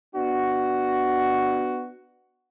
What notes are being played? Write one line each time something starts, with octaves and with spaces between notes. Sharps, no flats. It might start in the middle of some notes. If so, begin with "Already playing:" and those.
B3 D4 F#4